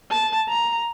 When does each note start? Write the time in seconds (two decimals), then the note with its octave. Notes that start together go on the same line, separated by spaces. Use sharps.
0.11 A5
0.49 A#5